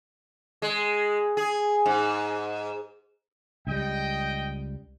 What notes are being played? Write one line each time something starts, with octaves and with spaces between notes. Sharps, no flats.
G#3
G#4
G#2
C#2 G3 D#5 G5